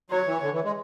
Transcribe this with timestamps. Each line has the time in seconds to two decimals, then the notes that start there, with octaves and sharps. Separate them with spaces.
0.10 F#3 C#5
0.26 E3
0.42 D3
0.53 E3
0.64 G#3